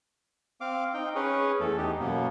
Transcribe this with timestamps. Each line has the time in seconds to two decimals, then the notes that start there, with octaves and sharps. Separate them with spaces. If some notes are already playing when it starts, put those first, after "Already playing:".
0.61 C4 F5 D6
0.94 D#4 G5
1.15 C#4 G#4 B4 C#5
1.60 E2 A3 A4
1.78 D#4 G4
2.00 F#2 B2 A#3 B3